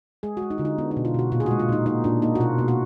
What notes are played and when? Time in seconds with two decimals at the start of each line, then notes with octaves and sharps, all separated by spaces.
0.23 G#3 G#4
0.37 F#4
0.42 G#3
0.50 D#4
0.58 D3 F4
0.65 D#4
0.78 B3 D4
0.91 D#4
0.97 B2
1.05 F4
1.14 B2 F#4
1.32 A#2 F4
1.40 G#4
1.46 G#3 F#4
1.60 F4
1.69 A#2 D#4
1.86 A#3 D#4
2.04 A#2 D4
2.22 A#3 D#4
2.35 F#4
2.40 B2 F4
2.58 B2
2.68 F#4